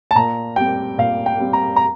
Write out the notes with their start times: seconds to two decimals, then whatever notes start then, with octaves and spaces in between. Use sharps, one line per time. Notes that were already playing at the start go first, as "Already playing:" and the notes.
0.11 A5
0.15 A#2 A#5
0.56 G3 C4 G5
0.98 A#2 F5
1.26 G5
1.40 G3 C4
1.53 A#5
1.76 A#5